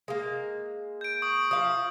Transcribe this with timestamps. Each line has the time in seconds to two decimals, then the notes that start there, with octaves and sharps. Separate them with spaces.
0.08 G#3 A#3
1.01 G6 D7
1.22 C#6 D#6
1.51 F3 F5 D#6